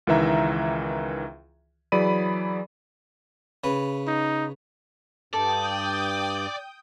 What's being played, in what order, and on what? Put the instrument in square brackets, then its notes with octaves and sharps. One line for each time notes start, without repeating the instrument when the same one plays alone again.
[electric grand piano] C#2 D#3 E3 E5 A#5
E3 F#3 G#4 D5 B5 D#7
[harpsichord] C#3 B4
[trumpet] D#4
[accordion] G2 [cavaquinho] A4 [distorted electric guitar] D5 [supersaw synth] G5 D#6 G6